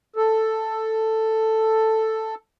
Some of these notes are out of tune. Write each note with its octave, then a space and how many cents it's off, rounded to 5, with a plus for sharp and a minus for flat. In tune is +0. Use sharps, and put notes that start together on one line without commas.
A4 +5